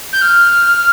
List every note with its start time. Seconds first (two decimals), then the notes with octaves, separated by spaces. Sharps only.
0.12 G6
0.21 F6